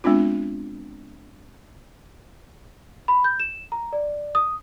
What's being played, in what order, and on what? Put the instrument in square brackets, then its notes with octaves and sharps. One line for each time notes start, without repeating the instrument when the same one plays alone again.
[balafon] G#3 B3 C4 D4 F4
[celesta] B5
G6
E7
A#5
D5
D#6